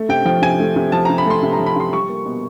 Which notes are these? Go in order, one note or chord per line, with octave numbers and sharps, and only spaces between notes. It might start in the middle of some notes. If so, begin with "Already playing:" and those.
Already playing: A3
C3 G5
F3 G5
C3 G#5
A3
C3
F3 A5
A#5
C3
B5
A3 C6
C3
A#5
F3
B5
C3 C6
G3 C#6
A#3
B2